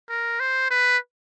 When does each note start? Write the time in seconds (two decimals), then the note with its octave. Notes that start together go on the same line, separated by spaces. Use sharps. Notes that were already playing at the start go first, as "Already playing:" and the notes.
0.10 A#4
0.40 C5
0.71 B4